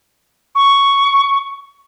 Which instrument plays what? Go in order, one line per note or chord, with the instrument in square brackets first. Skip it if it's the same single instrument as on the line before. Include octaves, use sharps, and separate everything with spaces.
[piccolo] C#6